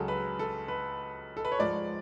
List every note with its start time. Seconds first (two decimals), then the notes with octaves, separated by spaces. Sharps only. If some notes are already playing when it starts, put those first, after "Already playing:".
Already playing: C#2 C#3 F#3 A4
0.08 B4
0.39 A4
0.68 B4
1.37 A4
1.45 B4
1.52 C#5
1.59 G#2 F3 D5